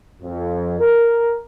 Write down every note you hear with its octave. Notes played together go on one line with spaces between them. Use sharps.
F2
A#4